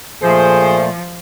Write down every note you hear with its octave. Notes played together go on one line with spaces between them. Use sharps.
A#2 F3 A3 G#4 C5